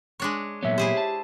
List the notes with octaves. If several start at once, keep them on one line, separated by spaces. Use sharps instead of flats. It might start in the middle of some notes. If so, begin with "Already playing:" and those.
G#3 D4 C#5
A#2 F#3 B3 C#5 E5
E4 G4 G#4 C5
A5